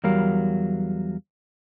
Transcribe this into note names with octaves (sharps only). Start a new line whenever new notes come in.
E2 F#3 G3 A#4 F5